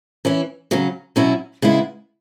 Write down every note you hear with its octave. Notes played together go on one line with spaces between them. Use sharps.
E3 C#4 E4
C#3 F#3 C#4
B2 F#3 C#4 E4
C#3 G#3 B3 E4